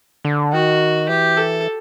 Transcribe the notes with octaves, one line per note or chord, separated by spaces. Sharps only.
D3
D#3 F#4
E3 G4
A4